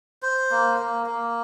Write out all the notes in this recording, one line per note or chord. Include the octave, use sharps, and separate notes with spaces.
C5
A#3
A#3
A#3